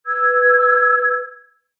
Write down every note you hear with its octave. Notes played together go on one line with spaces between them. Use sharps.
B4 E6 G#6